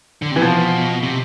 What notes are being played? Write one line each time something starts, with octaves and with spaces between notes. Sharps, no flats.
D3
C3 E3
B2 F3
C3